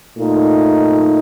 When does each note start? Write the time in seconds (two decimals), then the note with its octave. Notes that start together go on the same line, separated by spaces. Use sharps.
0.19 A#2 A3 D#4